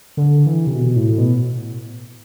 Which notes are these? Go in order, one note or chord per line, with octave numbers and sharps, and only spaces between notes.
D3
E3
C3
B2
A2
B2